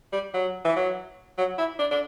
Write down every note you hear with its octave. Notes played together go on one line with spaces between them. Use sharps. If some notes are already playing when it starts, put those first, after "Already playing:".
G3
F#3
E3
F#3
F#3
E4
D4
D4